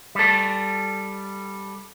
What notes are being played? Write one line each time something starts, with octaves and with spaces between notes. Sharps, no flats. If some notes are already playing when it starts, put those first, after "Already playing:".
G3 A4